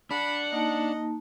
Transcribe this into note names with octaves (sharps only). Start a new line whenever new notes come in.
D4 F#5 B5
A#3 D#4 D#5 A5